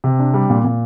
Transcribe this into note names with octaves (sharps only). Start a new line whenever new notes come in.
C3
D4
G3
A#2
A#2